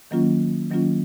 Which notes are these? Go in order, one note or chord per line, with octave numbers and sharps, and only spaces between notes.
D#3 F#3 A#3 C#4 F4
D#3 F#3 A#3 C#4 F4